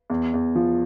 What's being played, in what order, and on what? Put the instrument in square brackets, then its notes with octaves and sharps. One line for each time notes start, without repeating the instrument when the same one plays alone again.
[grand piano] E2
E2
F3